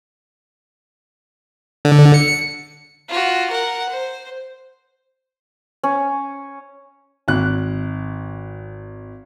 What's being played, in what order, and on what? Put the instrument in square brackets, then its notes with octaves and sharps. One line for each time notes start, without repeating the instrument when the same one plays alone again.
[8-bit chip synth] D3
C#7
[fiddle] F4 F#4
A#4 F#5
C5
[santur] C#4
[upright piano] G#1 F#6